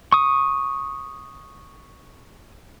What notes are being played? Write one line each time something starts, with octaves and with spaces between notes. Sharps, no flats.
C#6 D#6